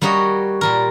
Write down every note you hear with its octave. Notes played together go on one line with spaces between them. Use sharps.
G3 A#3 F#4 C#5 D#5
A#2 G3 A#4